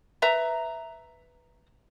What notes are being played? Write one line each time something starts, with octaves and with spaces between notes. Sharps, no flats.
B4 E5 A#5